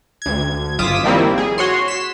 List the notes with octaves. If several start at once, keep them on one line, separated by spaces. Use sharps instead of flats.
D2 G#6
G1 F4 D6 D#6 B6 E7
D#3 F3 G3 A#3 C4 E4
G#4
F#4 C#5 C6
B6 C7 E7